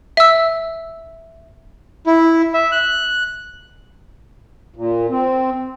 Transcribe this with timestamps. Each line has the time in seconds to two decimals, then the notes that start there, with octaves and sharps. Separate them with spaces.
0.17 E5 E6
2.06 E4
2.54 E5
2.72 F#6
4.76 A#2
5.10 C4